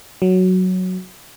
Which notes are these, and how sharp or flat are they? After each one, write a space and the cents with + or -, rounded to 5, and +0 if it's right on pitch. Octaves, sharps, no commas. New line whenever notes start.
F#3 +0